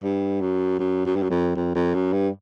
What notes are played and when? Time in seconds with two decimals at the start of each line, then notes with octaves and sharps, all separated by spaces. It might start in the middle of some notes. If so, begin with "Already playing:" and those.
0.03 G2
0.41 F#2
0.79 F#2
1.06 F#2
1.16 G2
1.23 F#2
1.30 F2
1.56 F2
1.75 F2
1.94 F#2
2.13 G2